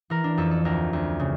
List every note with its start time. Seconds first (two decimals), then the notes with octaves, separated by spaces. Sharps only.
0.10 E3 A#4
0.24 D4
0.37 F2 A4
0.51 A4
0.65 D2 A#4
0.93 D2
1.20 C#3